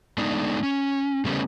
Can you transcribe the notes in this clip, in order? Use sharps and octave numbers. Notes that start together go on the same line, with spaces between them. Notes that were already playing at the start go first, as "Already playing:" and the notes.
G#3 A3 B3 D4 D#4
C#4
C#3 G3 A3 B3 C#4